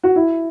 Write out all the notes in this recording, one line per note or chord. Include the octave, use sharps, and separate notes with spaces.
F#4
E4